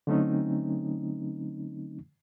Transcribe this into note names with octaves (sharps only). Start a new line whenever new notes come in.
D3 F#3 A3 C4 C#4 D#4